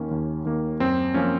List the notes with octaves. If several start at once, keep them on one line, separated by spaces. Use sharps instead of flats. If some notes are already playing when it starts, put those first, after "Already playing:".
Already playing: D#2 D#3 A#3 C#4
D#2
D#3 A#3
F#2 C4
F3 A#3 C#4